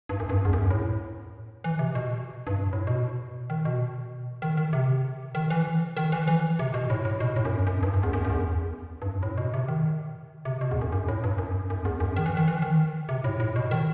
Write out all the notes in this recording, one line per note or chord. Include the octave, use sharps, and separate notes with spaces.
G2
F#2
G2
F#2
E2
F#2
A2
E3
C3
B2
G2
F#2
A2
B2
D#3
B2
D#3
D#3
C3
D#3
E3
D#3
E3
E3
C3
B2
A2
A2
B2
A2
F#2
G2
F#2
G2
F#2
E2
F#2
F#2
E2
G2
F#2
A2
B2
C3
D#3
C3
B2
E2
F#2
F#2
A2
G2
F#2
F#2
E2
F#2
D#3
E3
D#3
E3
D#3
C3
A2
A2
B2
D#3